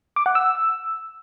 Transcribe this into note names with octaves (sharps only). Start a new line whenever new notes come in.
D6
F#5
E6